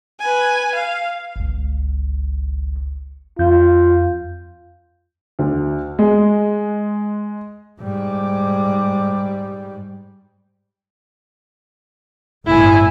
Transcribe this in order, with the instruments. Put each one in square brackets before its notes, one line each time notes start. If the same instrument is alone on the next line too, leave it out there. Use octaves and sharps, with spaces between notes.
[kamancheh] B4 G#5
F5
[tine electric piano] G1 C#2
[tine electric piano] F2 G6 [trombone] F4
[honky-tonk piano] D2
G#3
[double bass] G#2 G3
[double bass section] G1 A2 [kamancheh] E4 G#5